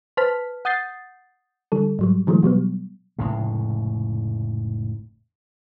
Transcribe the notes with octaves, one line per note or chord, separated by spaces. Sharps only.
B4 C5 A5 F6 B6
F#5 D#6 G6 A6 C7
D3 G3 A4
G#2 F#3 G3
D3 E3 F#3 G#3 A3
B2 F#3 G3 B3
F1 A2 C#3 G#3